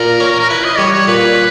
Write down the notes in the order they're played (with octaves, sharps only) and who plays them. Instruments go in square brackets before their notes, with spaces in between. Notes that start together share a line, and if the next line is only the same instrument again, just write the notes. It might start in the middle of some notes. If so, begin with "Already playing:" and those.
Already playing: [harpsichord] A#2 [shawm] A#4
[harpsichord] C#4
[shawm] A#4
[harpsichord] E4 [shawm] B4
[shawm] D#5
[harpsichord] G3 [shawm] C#5
[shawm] C#5
[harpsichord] A#2 [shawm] B4